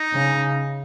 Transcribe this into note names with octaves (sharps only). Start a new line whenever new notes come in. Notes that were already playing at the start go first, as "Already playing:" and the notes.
Already playing: D#4
C#3